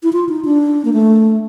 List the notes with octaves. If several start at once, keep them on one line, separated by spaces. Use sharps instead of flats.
E4
F4
D#4
D4
A#3
A3